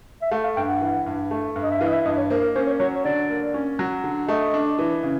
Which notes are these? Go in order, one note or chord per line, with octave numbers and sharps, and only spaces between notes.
E5
A3 F5
F5
G2 G5
F#5
E3
G2
A3
G2
D#5
E5
E3 F5
D#5
E5
G2 D#5
C#5
A#3 C5
A#4
C#4 C5
C#5
F#3 C#5
C#5
D3 D5
A#3
C#4
F#3
D3
A3 D#5
D4
E3
C#3